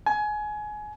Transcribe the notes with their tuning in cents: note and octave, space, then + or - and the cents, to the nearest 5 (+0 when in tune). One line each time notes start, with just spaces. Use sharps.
G#5 +25